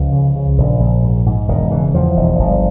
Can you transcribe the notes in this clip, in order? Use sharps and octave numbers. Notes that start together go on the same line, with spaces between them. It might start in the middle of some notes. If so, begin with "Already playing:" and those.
Already playing: C#2 F3
C#3
C#3
A#1
A#1
G#2
G#2
E1 D#3
C#3 E3
E2 F3
E1
G1